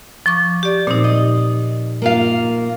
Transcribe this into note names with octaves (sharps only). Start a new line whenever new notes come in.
F3 C#6 D6
G4 D5
A#2 C4 D#4
D#5
A#3 F4 F5